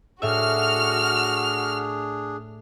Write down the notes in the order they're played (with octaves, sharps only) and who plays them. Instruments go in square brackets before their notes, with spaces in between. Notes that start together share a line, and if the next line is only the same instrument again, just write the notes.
[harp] A2 E5 [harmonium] D4 G#4 [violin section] F#4 F6